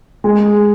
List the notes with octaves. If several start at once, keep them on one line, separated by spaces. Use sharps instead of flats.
G#3